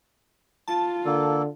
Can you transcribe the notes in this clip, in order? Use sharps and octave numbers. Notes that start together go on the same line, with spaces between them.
F4 A5
D3 A#3 A4